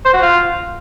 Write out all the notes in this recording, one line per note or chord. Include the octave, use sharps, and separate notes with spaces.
C5
F#4
F4